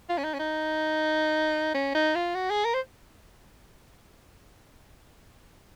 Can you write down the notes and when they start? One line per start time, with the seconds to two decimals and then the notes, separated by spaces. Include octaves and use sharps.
0.09 F4
0.18 C#4
0.24 D#4
0.34 C#4
0.39 D#4
1.74 C#4
1.95 D#4
2.15 F4
2.35 F#4
2.50 G#4
2.65 A#4
2.74 C5